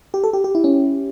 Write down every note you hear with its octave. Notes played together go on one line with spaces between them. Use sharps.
G4
A4
G4
G4
E4
C#4